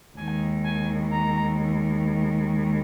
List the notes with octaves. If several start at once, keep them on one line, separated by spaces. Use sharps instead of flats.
D#2 D#3 G#3 G#5
G#5
A#5